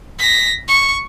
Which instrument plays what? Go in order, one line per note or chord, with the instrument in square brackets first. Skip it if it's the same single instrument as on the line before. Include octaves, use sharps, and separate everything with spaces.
[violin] A#6 B6
C#6